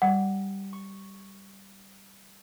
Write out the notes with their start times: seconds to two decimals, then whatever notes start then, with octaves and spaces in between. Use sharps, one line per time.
0.02 G3 F#5
0.73 C#6